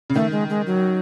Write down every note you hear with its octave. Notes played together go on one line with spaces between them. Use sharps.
C#3
D#3 A3
G#3
G#3
F#3